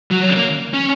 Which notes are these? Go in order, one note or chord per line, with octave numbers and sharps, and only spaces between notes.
F#3
A#3
C#4